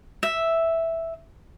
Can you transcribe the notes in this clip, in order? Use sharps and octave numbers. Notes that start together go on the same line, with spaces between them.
E5